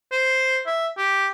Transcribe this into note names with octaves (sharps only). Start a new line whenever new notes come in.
C5
E5
G4